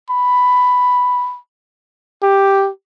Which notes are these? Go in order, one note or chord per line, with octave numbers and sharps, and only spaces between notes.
B5
G4